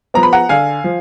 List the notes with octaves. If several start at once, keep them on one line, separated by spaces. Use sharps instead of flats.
F3 B3 A#5
B5
F#5 A#5
D3 F5 G#5
F3